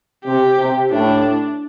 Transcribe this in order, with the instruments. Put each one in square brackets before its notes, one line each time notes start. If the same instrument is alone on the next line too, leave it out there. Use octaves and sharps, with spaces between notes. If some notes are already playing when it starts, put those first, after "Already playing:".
[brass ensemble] C3 [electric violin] G4
[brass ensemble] C3
[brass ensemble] A2 [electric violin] D4